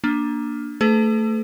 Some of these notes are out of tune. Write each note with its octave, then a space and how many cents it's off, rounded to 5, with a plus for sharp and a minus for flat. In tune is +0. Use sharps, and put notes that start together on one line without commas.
A#3 +10 D4 +5
A3 +20 G#4 +45 B4 +35